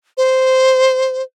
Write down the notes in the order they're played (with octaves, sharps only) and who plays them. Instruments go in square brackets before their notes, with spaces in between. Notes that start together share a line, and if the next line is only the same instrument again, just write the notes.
[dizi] C5